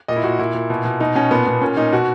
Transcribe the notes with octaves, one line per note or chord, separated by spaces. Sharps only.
A#2 D#5
E4
A#2 F#4
A#2 E4
A#2
B2
B2
B2 D#4
B2 C#4
A#2 B3
A#2 B3
A#2 C#4
A#2 D#4
B2 F#4